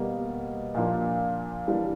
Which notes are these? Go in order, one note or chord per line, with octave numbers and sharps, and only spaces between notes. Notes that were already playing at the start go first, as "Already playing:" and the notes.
Already playing: B2 G3 A#3
A#2 F3 A#3 D4 F4
E3 G3 A#3 D4